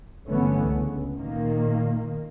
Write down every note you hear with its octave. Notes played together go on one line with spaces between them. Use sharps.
G1 D3 E3 A3 B3 C#4
C#2
A#2 D#3 A#3